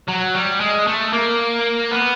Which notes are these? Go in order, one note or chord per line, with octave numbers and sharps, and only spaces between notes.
F#3
G3
G#3
A3
A#3
B3